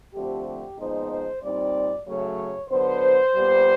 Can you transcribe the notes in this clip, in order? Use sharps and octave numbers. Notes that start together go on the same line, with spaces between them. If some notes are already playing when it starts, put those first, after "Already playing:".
D3 F3 A3 C4 G4
G4
A#2 F3 G#3 B3 D#4 C5
C5
A#2 G3 C4 D#4 D5
C#3 F#3 A3 C#5
D3 F#3 B3 C5
A#2 G3 B3